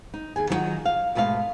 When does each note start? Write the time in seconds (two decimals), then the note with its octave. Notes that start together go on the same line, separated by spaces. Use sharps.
0.14 D#4
0.36 D#2 G#4 G#5
0.50 D#3 F#3 G3 D#4 F4 F#4
0.85 F5
1.15 G#2 B2 A3 A4 F5